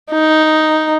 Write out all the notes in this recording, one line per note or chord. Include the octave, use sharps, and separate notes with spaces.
D#4